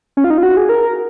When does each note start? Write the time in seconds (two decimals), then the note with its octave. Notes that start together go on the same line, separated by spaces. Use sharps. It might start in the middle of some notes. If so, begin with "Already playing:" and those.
0.17 C#4
0.24 F4
0.30 D#4
0.38 F4
0.43 F#4
0.57 G#4
0.69 A#4